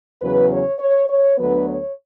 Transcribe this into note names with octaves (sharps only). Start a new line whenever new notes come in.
E2 C#3 F#3 B4
C#5
C#5
C#5
D2 D3 F#3 B3 B4
C#5